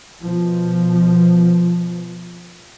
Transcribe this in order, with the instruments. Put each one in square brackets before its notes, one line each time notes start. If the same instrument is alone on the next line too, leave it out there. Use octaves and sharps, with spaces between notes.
[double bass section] B2 F3